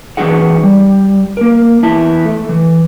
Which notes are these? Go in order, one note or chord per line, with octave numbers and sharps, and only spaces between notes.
E3 D#4 F#4 G#4 F#5
G3
A#3 A#4
E2 E4 A5
A3
E3